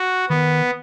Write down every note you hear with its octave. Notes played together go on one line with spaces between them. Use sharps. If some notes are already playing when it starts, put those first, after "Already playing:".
Already playing: F#4
D#3 B3